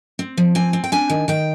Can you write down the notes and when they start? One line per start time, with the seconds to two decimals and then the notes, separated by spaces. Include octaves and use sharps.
0.19 C4
0.37 F3
0.55 C4 G#5
0.73 C4
0.84 G5
0.92 D4 G#5
1.10 D#3
1.28 D#3 G5